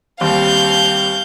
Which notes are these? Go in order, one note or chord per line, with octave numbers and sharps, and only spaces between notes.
D#2 G3 C4 F5 G6